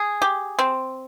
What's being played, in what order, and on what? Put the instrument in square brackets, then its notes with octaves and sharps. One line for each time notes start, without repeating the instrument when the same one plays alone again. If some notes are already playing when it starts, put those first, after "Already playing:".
Already playing: [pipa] G#4
G4
C4